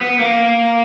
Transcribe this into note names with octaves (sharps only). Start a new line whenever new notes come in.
B3
A#3